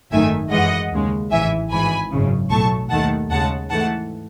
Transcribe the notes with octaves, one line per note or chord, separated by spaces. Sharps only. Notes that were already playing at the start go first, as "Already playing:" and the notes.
G#1 F#2 D#3 A3 E5 G#5
F#2 E3 G#3 D#5 F#5
D#2 C#3 G#3
A1 G#2 E3 E5 G#5
G#1 G#2 E3 G#5 B5
G#1 F#2 C#3
B1 A2 F#3 A3 A5 C#6
D#2 D#3 A3 F#5 A5
D#2 C#3 G#3 F#5 A5
G#2 E3 A3 F#5 A5